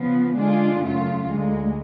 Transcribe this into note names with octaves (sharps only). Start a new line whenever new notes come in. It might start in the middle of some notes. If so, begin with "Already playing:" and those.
Already playing: C#3 F3 B3
D3 G#3 D4 F4 G#4
F#2 C#3 F#3 A3 F4
D2 D3 G#3